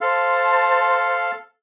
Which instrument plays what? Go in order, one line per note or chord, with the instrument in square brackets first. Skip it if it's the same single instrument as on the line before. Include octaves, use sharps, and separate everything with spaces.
[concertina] A4 F5 [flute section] C5 A5 C6